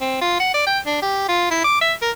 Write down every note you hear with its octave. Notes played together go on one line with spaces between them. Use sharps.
C4
F4
F#5
D5
G5
D4
G4
F4
E4
D6
E5
A#4